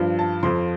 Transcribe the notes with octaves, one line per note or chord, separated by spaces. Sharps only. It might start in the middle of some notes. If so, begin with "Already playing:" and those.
Already playing: G2 F3
A5
F2 F3 C6